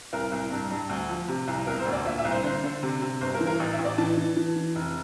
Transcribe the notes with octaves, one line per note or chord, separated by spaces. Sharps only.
C2 A#4
C2
G2
G2
D2
F3
C3
C2
E1 A#4
C5
D2
D5
A#2 E5
E5
C2
C5
D3 C5
D3
C3
C3
G1 C5
A#4
E3
A#4
A1
E5
A1
D5
E3 A5
E3
E3
E3
F1